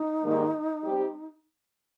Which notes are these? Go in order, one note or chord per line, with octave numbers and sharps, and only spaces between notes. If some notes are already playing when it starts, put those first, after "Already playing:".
Already playing: D#4
G#2 D#3 G3 A#3
G3 C4 G4